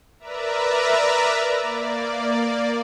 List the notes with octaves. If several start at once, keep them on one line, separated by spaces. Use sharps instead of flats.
A#4 B4 D5 E5 A#5
A#3 D5